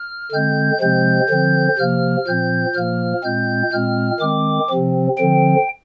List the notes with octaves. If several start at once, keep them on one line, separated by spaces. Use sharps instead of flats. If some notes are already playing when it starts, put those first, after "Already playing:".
Already playing: F6
D3 G#3 C4 G6
C3 F3 G#3 C4 G6
D3 F3 C4
C3 F3 A#3 F6
A#2 F3 C4 G6
A#2 F3 A#3 F6
A#2 G#3 C4 G6
A#2 G#3 C4 F6
D#3 G#3 C4 D6
C3 F3 C4
D3 F3 C4 G5